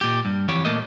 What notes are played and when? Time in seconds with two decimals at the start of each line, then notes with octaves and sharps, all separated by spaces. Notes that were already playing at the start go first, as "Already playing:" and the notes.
0.01 A#2 G4
0.25 G2
0.48 F2 E3 G4 C#5
0.65 A#2 E3 A3 A#3 D#5